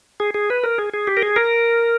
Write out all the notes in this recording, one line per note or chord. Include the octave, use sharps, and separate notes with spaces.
G#4
G#4
B4
A#4
G#4
G#4
G4
A#4
G#4
A#4